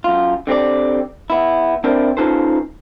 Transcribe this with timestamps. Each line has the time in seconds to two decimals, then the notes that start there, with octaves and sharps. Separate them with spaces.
0.04 F#2 F4
0.47 D3 C4 G4 D5
1.30 B3 E4
1.84 C4 D4 E4 A#4 C5 D5
2.17 C#4 D#4 F4 A4 B4 C5